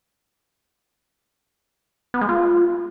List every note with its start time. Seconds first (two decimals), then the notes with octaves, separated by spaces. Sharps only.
2.14 B3
2.21 G#3
2.29 F4